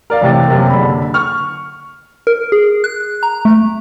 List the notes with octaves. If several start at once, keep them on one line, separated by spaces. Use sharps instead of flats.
A#4 D5 F5
A1 C3 A6
F#2 C3 A#3
F#1 D3 D4 B5
C#6 F6
A#4
G#4
F#6
A#5
A3